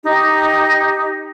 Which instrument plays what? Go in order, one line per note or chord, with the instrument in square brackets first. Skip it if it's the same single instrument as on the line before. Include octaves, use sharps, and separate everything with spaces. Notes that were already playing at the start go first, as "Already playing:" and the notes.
[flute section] D#4 G4